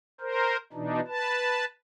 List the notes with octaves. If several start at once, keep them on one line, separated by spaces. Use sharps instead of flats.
A#4 C5
B2 E3 D4 D#4
B4 A5